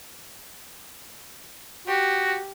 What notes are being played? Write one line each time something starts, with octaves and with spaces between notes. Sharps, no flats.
F#4 G4